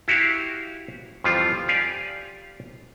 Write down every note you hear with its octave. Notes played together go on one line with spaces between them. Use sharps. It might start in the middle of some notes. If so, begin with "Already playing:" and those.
E4 F#4 G4 F5
F2 E3 F3 G3 F4
G4 D5 F5 G#5